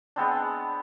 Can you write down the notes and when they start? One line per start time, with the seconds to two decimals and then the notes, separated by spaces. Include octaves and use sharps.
0.16 G#3 B3 C4 D4